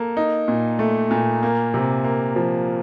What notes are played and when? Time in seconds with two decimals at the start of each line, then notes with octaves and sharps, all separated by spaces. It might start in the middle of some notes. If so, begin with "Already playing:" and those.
Already playing: A#3 A4
0.17 D#4
0.48 A#2
0.79 A3
1.11 A#2
1.43 A#3
1.74 C3
2.04 A#3
2.36 F3